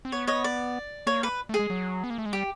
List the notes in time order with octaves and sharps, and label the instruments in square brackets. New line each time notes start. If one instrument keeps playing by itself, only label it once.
[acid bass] C4
[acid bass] B3 [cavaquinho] C#5
[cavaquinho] C#5 D#5
D5
[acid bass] A#3 [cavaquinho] C#5
[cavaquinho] B4
[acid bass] A3
[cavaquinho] G#4
[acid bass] G#3
F#3
B3
A#3
A3
G#3
[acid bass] G3 [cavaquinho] G4